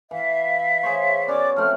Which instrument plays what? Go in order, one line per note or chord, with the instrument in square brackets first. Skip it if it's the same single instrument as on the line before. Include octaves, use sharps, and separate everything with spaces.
[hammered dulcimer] E3 [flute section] E5 F5
[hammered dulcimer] G#4 C5 C#5
[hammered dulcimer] B3 C#4 F#4 [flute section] D5 D6
[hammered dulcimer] F3 A3 C4 [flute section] F6